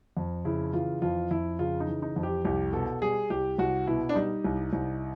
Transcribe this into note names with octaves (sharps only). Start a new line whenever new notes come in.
F2
C#3 E4
E3 F4
F2 F4
F2 E4
C#3 F4
D#4
E3
D#4
F2
G4
C2 G4
B2 A4
G3 G#4
C2 G4
C2 F#4
B2 E4
D4
G3 D#4
C2
C2